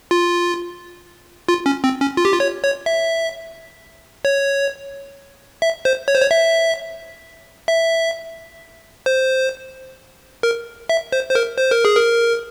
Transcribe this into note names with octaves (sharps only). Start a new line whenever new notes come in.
F4
F4
C#4
C4
C#4
F4
G4
F4
C#5
C#5
E5
C#5
E5
C5
C#5
C5
C#5
E5
E5
C5
A#4
E5
C5
C5
A#4
C5
A#4
G#4
A#4